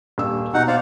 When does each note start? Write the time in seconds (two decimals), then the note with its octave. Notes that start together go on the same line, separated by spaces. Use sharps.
0.18 D#1 G3 E6
0.54 B2 D#4 F#5
0.68 C5 D5 F5